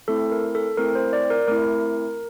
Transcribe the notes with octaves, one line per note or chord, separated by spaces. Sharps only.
A3 C4 E4 A4
A#4
A4
A3 C4 E4 A#4
C5
D5
A#4
A3 C4 E4 A#4